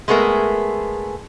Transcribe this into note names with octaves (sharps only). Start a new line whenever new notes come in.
G#3 A3 B3 G#4 A#4 E5